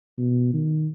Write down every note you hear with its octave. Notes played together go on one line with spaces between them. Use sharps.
B2
D#3